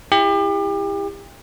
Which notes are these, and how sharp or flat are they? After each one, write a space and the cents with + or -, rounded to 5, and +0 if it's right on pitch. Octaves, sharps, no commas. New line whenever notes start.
E4 +0 G4 +35